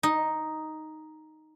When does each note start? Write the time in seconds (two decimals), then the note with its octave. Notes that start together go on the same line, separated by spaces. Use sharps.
0.03 D#4